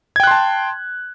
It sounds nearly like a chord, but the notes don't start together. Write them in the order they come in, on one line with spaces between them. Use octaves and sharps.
G#6 G5 F#6 C6 A5